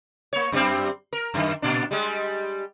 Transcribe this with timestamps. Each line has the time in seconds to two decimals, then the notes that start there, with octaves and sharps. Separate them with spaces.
0.33 A#3 C#5
0.52 F#2 G3 C4
1.13 A#4
1.34 F#2 D#3
1.62 A#2 D4
1.91 G3 G#3